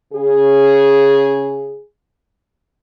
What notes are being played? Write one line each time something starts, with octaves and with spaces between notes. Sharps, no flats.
C#3 G#4